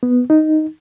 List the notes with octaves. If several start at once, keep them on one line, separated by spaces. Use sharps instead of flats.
B3
D#4